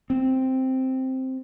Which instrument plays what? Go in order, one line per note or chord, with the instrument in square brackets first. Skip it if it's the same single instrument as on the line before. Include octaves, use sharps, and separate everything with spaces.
[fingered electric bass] C4